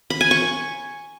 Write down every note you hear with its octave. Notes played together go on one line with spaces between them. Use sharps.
B5
G#5
C#6